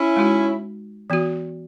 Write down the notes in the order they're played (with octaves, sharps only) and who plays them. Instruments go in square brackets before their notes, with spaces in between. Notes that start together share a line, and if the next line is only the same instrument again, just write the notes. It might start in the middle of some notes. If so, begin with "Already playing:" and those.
Already playing: [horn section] C#4 E4
[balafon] G#3 D#4 F#4
E3 B3 F#4